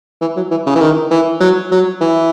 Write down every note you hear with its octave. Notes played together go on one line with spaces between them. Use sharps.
E3
F#3
E3
C#3
E3
D#3
E3
F#3
F#3
E3